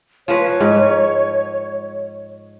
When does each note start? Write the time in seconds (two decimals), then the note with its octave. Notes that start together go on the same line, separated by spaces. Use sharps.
0.28 F3 B4 C#5
0.60 G#2